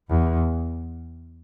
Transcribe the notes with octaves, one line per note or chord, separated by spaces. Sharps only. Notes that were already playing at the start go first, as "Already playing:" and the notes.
E2